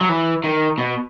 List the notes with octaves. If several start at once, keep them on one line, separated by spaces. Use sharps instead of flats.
F#3
E3
D#3
B2